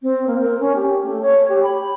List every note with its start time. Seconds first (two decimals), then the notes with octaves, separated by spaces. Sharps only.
0.03 C4
0.27 A#3
0.40 A#4
0.60 C#4
0.75 G4
1.03 A3
1.22 C#5
1.49 G4
1.64 B5